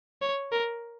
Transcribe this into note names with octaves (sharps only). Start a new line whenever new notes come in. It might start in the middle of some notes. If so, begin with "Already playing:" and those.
C#5
A#4